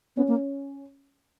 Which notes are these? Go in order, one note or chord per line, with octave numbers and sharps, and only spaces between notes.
B3 C#4
A#3